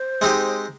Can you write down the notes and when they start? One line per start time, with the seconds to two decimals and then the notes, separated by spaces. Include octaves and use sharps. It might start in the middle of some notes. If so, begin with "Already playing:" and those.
Already playing: C5
0.21 G#3 C4 D#4 G4